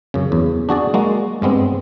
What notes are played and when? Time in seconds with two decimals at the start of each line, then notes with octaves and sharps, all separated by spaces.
0.14 F#2 C#3
0.32 E2
0.69 D4 F#4 G#4 D5
0.94 G#3 A#3 F#4
1.42 G2 G#3 B3 C4